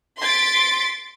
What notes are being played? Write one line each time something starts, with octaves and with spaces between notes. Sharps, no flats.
C6 A6 B6 D7